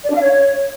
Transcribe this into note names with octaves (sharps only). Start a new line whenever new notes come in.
D5
D4
F5
C#5